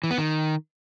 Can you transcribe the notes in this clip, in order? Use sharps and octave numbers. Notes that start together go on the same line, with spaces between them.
E3
B3
D#3